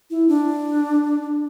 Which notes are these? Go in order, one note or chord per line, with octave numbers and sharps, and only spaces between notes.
E4
D4